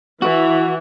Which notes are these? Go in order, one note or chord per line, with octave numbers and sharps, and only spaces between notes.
E3 F#4